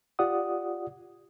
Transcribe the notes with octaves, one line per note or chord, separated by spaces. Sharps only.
F4 G4 D5 F#5 D#6